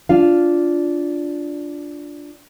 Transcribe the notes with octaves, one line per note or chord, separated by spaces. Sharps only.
D4 F4 F5